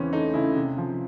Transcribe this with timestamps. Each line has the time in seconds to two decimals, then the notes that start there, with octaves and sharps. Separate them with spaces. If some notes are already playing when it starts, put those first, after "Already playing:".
Already playing: E2 C#3 E3 C4 C#4
0.13 A3 D#4
0.34 C#3 E4
0.55 C3
0.78 F3